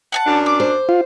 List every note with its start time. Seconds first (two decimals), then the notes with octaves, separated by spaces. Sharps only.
0.12 F#5 G#5 A5
0.26 F#2 D4
0.46 D6
0.60 C5
0.89 F4